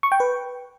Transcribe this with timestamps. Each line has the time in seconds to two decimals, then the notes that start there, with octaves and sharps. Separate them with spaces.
0.03 C#6
0.12 G5
0.20 B4